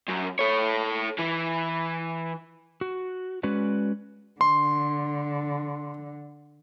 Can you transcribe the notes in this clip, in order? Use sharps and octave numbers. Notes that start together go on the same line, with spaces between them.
F#2
A4 C#5
E3
F#4
G#3 C#4 F#4 B4 D5
D3 C6